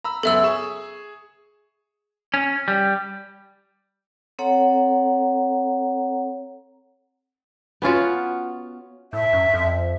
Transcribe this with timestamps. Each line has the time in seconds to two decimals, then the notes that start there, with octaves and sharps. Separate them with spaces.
0.04 A#5 B5 E6
0.23 C#2 F#2 B3 A4 E5 E6
0.44 G#4 C#6 E7
2.34 C#4
2.68 G3
4.39 C4 A4 C#5 F#5 A#5
7.82 B3 C#4 F4 F#4
9.13 A2 E5
9.33 F#2
9.54 F2